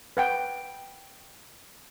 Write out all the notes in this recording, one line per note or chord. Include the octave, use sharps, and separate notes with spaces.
B4 F#5 G5